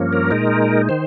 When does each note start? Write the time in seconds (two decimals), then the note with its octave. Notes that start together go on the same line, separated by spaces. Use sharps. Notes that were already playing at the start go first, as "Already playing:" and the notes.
Already playing: G2 F3 A#3 C#4
0.13 A#4
0.31 A#2 G#3 D#4
0.89 D#3 C5